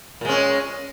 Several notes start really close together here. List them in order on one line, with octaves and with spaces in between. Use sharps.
A#2 G#3 C#4